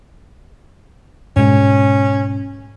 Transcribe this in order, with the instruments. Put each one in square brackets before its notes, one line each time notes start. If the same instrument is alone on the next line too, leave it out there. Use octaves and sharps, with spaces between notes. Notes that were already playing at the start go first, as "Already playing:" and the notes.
[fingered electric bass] G#2 B2 G#3 [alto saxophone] C#4